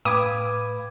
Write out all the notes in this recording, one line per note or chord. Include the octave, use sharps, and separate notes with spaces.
A2 B4 F5 G5 B5 D6 D#6 G#6